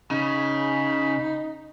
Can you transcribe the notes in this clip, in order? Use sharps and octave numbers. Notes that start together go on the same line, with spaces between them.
C#3 D#4 B5